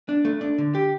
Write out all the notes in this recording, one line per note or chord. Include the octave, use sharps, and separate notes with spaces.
D4
A3
D4
D3
G4